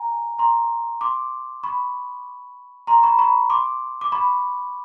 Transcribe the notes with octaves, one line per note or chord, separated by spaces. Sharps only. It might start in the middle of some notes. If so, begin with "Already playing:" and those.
Already playing: G#5 A#5
A#5 C6
C6 D6
B5 C#6
A#5 C6
B5 C#6
B5 C#6
C6 D6
D6
B5 C#6